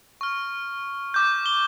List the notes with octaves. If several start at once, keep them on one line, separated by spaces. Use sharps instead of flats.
C#6 F6
D6 G6
G7